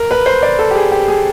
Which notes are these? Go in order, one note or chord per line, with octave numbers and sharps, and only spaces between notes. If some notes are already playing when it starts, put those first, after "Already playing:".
Already playing: A#4
B4
C5
D5
A4
G4
G#4
G4
G#4